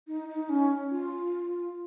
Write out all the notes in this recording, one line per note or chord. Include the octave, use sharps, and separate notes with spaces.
D#4
D#4
C#4
F4